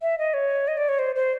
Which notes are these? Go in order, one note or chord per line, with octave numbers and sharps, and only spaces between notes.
E5
D#5
C#5
D#5
D5
C#5
C5
C5